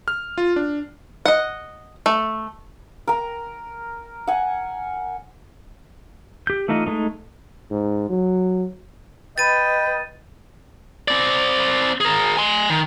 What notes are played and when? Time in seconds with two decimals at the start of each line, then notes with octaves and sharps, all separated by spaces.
0.08 F6
0.38 F4
0.56 D4
1.26 D#5 F#5
2.06 A3
3.07 A#4 A#5
4.27 F#5 G#5
6.47 G4 G6
6.68 E3 A3 D#4 F4 D#5
6.87 G#3 A3 D#4
7.71 G#2
8.10 F#3
9.38 B4 D#5 G5 A6 D#7
11.08 C4 D5
12.01 G#4 A#4
12.37 G#5 C6
12.70 D#3